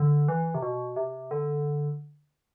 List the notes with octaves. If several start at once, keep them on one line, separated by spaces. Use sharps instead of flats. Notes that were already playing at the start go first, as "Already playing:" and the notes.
Already playing: D3
E3
C3
B2
C3
D3